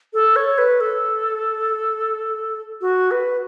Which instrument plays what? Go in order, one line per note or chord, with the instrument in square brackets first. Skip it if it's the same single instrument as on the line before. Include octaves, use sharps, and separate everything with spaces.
[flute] A4
C#5
B4
A4
F#4
B4